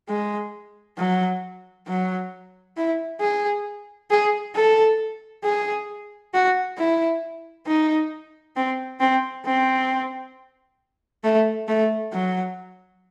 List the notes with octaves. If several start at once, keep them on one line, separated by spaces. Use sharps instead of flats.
G#3
F#3
F#3
E4
G#4
G#4
A4
G#4
F#4
E4
D#4
C4
C4
C4
A3
A3
F#3